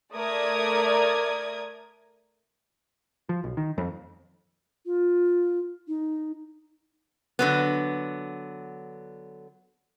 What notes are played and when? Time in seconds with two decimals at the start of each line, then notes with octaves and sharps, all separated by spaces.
0.13 A3 A#4 D5 D#6 G#6
3.29 F3
3.44 B1
3.57 D#3
3.78 F2
4.86 F4
5.88 D#4
7.39 D3 F#3 B3